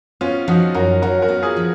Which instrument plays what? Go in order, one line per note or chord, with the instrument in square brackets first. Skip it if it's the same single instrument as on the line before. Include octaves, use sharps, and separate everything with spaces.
[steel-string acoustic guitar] B3 [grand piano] C#4 F4
[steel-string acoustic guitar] F3 [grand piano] D#4 F#4
[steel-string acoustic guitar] F#2 [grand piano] F#4 A#4
[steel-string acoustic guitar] F#2 [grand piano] F#4 A#4
[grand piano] F#4 A#4
[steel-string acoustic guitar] B3
[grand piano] F4 G#4
[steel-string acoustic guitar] F3